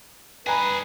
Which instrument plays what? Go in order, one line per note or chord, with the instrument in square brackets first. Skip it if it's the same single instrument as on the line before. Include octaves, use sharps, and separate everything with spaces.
[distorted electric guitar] G2 G#4 [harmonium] B4 [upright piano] G#5 A#5